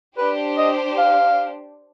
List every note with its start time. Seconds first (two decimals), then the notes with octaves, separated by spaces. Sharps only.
0.18 D4 G4 B4 C5
0.58 D#5
0.98 F5